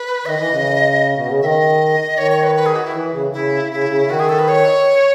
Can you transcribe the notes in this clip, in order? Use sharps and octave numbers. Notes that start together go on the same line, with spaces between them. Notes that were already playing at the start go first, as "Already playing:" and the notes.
Already playing: B4
D#3 D#5 E5
E3
C#3
B2
C#3
D#3 D#5 E5
D#3 C#5
C#5
B4
B4
G#4
F#4
E4
E3
C#3
C#3 E4
C#3 E4
C#3
D#3 F#4
G#4
A4
B4
C#5